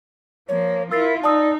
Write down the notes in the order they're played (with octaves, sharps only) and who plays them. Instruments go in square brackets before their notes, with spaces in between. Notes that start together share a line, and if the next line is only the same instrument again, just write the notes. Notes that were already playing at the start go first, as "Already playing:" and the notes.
[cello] F3 A#3 [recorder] C#5
[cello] E4 F4 [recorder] A#4 [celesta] E6 A6 C7
[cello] D#4 [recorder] D5 [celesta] A5 D#6 E6